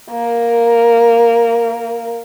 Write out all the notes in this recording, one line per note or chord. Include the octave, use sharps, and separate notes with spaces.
A#3 A#4